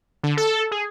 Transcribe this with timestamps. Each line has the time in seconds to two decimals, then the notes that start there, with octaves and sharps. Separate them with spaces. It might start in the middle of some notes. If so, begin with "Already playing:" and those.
0.24 D3
0.37 A4
0.71 G#4